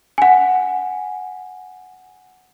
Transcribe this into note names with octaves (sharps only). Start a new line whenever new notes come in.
F#5 G#5